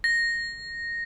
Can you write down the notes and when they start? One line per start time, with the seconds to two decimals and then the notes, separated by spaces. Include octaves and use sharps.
0.04 A#6